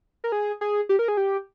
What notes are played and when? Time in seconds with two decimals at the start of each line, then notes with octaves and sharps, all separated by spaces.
0.24 A#4
0.32 G#4
0.61 G#4
0.89 G4
0.99 A#4
1.08 G#4
1.17 G4